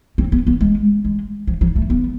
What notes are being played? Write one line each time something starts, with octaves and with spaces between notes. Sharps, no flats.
C4
B3
B3
G#3
G#3
F3
F3
A3
B3